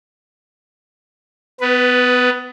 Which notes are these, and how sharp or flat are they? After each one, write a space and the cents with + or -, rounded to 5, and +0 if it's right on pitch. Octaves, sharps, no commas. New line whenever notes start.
B3 +25 B4 +0